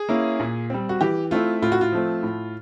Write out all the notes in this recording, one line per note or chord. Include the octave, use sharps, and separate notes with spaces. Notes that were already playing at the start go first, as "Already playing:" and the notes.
Already playing: G#4
A#3 C#4 E4
A#2
G3 C4
F#4
E3 G4
A3 C4 E4 F4
A2 F4
F#4
F4
F3 A3 C4
A2